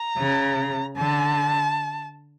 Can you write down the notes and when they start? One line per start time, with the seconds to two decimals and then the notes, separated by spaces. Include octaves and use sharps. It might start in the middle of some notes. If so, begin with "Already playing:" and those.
Already playing: A#5
0.18 C#3
0.96 D3 A5